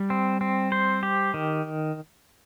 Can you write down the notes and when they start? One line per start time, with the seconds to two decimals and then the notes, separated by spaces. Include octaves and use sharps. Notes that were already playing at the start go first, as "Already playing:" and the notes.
Already playing: G3
0.10 C4
0.41 C4
0.72 C5
1.03 G4
1.34 D#3